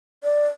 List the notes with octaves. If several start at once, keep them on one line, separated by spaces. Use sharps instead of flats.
D5